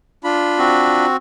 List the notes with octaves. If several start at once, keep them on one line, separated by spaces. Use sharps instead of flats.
D4 F4 B5
C4 F#4